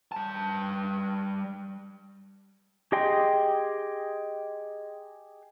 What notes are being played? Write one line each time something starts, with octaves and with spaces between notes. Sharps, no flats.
G3 A5
G4 G#4 D#5 G5 C6